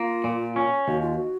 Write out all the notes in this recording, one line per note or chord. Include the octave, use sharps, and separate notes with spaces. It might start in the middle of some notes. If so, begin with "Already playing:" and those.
Already playing: A#3 F4
A#2
C#4
D#2 F#4
F4
F#4